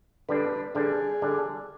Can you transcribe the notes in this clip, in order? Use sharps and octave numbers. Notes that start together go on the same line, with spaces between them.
D3 G3 D4 B4
D3 G3 D4 G#4
D3 G3 D4